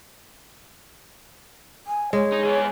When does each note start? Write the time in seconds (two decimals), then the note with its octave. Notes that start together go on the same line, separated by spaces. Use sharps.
1.87 G#5
2.13 G#3 C#5
2.32 D#4
2.43 B3 G#4